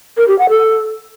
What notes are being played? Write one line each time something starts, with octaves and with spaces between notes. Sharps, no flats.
A#4
G4
F#5
A4